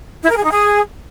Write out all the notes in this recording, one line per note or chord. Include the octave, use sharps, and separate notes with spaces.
E4
A#4
G#4
D#4
G#4